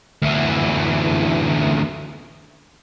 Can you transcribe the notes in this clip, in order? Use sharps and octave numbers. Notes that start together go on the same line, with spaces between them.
D2 E3